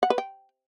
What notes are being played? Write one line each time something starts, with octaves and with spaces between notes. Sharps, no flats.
F#5
B4
G5